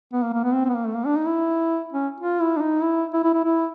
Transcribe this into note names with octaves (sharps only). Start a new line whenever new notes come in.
B3
A#3
A#3
B3
C4
C4
B3
A#3
A3
A#3
D4
D#4
E4
C#4
F4
E4
D4
D#4
E4
E4
E4
E4
E4